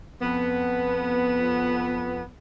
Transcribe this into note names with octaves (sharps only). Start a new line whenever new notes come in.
F2 B3